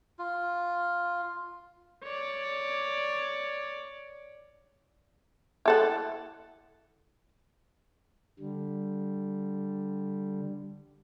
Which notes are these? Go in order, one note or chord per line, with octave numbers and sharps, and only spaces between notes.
F4
C#5 D5
E4 A4 F#5
D3 G3